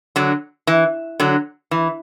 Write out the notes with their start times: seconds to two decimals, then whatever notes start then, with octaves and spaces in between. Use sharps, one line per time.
0.16 D3 F#3
0.67 E3
1.20 D3 F#3
1.71 E3